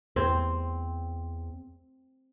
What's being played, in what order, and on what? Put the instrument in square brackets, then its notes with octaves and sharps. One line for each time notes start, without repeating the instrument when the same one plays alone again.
[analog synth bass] E2 [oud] C4